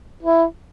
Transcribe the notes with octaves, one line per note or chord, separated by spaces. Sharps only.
E4